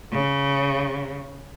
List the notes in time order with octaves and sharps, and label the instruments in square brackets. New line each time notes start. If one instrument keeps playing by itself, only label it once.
[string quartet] C#3